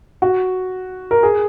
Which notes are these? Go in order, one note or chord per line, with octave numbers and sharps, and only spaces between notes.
F#4
A#4
G#4